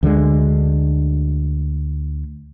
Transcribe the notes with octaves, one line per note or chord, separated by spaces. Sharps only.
D2 D3 E3 G#3